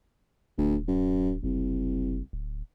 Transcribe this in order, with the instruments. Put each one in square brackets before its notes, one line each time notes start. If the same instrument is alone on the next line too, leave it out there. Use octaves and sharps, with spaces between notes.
[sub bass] D1 [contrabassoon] D2
[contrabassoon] F#2
[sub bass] F#1 [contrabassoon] C2
[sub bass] D1